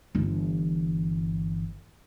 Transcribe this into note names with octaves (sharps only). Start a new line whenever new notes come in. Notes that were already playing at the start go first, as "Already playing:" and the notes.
G1 E3